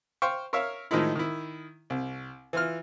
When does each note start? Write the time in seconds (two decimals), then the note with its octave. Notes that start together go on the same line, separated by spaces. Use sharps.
0.22 C5 F5 G5 C#6
0.53 A#4 C#5 E5 F5
0.91 A2 D#3 F3 G#3 D#4 E4
1.16 D#3 E4
1.90 C2
2.53 E3 F4 F6